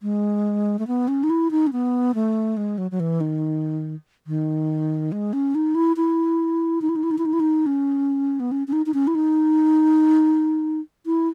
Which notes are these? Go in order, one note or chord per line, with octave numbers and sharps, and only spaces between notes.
G#3
A3
B3
C#4
D#4
E4
D#4
C#4
B3
A3
G#3
F#3
F#3
E3
D#3
D#3
G#3
C#4
D#4
E4
E4
D#4
E4
D#4
E4
D#4
E4
D#4
E4
D#4
C#4
B3
C#4
C#4
D#4
D#4
C#4
E4
D#4
E4